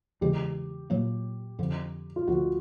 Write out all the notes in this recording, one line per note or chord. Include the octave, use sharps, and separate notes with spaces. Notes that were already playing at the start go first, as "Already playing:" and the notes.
E2 C#3 E3 G#3 G4
A#2 F#3 A#3
F2 D3 F3
F4
D2 D3 F3 F#4